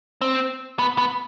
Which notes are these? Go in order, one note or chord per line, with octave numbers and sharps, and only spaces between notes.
C4
B3
B3